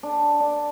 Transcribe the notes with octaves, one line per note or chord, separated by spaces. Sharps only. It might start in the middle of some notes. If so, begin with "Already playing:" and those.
D4
D4